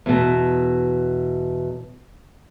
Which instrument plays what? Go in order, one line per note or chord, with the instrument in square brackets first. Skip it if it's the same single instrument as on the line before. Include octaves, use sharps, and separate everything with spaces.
[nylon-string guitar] E2 B2